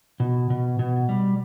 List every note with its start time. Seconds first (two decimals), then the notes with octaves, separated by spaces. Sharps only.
0.20 B2
0.50 B2
0.79 B2
1.09 G3